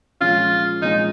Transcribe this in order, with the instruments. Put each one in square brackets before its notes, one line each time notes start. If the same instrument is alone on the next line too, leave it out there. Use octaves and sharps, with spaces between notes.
[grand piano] A#2 F3 G#3 C#4 [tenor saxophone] F4
[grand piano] A#2 F3 G#3 C#4 [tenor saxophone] D#4